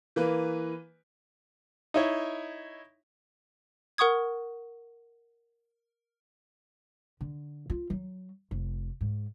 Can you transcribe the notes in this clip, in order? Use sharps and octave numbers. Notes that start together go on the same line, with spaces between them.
E3 A#3 B4
D#4 E4 C#5
A#4 F#5 C#6 D#6 G#6
D3
F4
F#3
F1
G#2